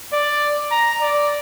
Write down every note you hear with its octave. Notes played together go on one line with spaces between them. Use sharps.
D5
A#5
D5